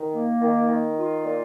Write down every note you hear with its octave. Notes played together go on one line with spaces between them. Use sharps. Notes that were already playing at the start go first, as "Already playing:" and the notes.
Already playing: D#3
A#3
D#3
D#3
F4
A#2